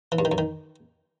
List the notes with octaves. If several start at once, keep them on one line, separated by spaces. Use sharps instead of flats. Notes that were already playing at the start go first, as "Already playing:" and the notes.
E3
G2
D#3
F#2
D#3